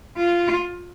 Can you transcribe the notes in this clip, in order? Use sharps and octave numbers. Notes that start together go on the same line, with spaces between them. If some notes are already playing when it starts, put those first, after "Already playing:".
F4